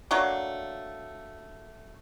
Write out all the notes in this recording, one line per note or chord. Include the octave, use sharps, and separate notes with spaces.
F#3 A3 A#3 D4